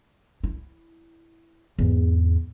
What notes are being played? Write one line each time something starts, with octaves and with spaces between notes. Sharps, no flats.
E4
E2 G#2